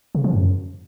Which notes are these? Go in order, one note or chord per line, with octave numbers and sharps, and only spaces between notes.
C#3
F3
F#2